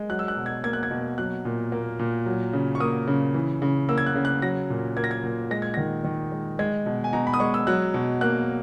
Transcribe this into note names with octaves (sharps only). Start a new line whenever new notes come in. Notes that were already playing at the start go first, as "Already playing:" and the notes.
Already playing: G#3
F#3 F#6
E6
F#6
B2
G#6
A#3 G#6
F#6
G#6
B2
F#3 F#6
A#2
A#3
A#2
F#3
C#3
C#6
A#3 D#6
C#3
E3
C#3
A#3 E6
G#6
F#6
C#3
F#6
F#3 A#6
A#2
A#3 G#6
A#6
G#6
A#2
G#3 A#6
G#6
D#3 A#6
D#3
G#3
G#3 G#6
B2
G#5
B2 A#5
B5
D#6
G#3 C#6
E6
F#3 F#6
B2
A#3 F#6